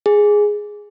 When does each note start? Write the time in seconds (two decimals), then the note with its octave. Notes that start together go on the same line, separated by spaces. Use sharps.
0.06 G#4